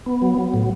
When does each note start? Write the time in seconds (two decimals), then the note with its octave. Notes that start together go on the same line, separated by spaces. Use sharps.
0.06 B3
0.22 F#3
0.39 F#3
0.54 A2